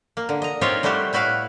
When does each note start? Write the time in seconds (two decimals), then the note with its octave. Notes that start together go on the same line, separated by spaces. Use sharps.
0.17 A#3
0.29 D3
0.42 D#5 A#5
0.61 C4 D#4 F4 G4 C#5 D5
0.83 G3 A3 E4 F#4 G4
1.13 A2 E4 F#4 B4 F5